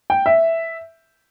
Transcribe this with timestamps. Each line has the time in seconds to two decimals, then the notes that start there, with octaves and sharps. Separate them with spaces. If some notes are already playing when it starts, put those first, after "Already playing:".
0.10 G5
0.26 E5